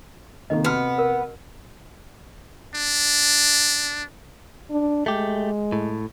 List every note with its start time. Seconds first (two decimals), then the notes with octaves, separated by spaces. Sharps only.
0.50 C3 D#3 A#3 A4 D#5
0.64 C3 B3 F#4 F#5 F6
0.98 A#4
2.75 D4
4.70 D4
5.06 G#3 A3 G4
5.72 A2